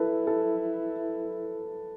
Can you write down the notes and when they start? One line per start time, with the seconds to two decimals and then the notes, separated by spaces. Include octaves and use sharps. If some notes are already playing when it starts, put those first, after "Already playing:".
Already playing: E4 A4 B4
0.27 A4